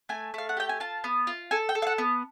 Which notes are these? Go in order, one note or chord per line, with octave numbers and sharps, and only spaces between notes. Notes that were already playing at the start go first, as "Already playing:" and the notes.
A3 G#5
A3 F5
F#5
G4 G5
G#5
F4 A5
B3
F4
A4 G#5
G5
A4
F5
F#5
B3